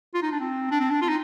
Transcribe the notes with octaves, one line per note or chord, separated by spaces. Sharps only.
F4
D#4
D4
C4
D4
C4
D4
F4
D#4